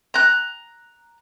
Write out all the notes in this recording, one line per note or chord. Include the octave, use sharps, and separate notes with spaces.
A#5 F#6